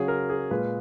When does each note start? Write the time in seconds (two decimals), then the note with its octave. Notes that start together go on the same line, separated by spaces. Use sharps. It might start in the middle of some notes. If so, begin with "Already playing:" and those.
Already playing: C#3 F#3 G#4
0.08 A#4
0.30 G#4
0.51 A#2 G#3 B4